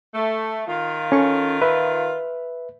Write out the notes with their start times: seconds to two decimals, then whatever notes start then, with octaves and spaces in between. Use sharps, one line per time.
0.14 A3
0.67 D#3 F4
1.12 C#4 A4 C#6
1.62 B4 E5